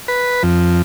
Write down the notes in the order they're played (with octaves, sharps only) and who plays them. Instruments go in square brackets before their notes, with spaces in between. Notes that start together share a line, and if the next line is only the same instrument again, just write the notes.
[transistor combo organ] B4
F2